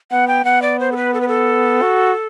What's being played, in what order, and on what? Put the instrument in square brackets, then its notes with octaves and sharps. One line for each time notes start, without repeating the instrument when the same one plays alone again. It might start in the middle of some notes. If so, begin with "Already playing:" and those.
[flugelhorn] B3 [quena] F#5
[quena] G5
[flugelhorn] B3 [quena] F#5
[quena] D5
C5
A4
B4
A4
B4
A4
[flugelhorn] F#4